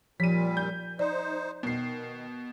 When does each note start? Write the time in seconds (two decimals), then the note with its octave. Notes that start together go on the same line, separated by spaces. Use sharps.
0.20 A#2 F3 G3 B6 D#7
0.57 G6
0.99 D#4 C5 D5
1.63 B2 D#3 C7